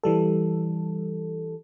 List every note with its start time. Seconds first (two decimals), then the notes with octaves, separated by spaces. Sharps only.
0.03 E3 G3 A4